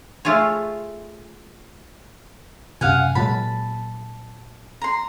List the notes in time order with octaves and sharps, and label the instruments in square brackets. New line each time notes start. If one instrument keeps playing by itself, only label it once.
[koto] A3 F4 G#4 C#5
[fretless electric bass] F#2 C3 [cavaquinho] F5 F#5 G#5
[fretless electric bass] A#2 F#3 G#3 [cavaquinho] A5 B5
[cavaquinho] A#5 C6